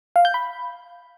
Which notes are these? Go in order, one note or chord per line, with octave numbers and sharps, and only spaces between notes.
F5
G6
B5